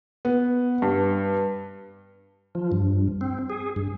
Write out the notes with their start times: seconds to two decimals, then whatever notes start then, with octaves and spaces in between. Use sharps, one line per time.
0.25 B3
0.82 G2
2.55 F3
2.72 G2
3.21 C4
3.50 G#4
3.76 G2